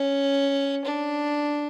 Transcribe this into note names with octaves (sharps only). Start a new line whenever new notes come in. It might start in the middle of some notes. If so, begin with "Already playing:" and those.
Already playing: C#4
D4